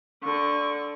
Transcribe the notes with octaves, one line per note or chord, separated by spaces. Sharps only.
D3 C#6